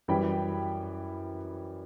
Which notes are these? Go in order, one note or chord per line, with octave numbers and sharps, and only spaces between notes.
F#2 E3 G3 G5 B5